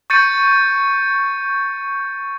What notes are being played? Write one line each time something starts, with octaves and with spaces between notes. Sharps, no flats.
C#6 G6 A6 C#7 D#7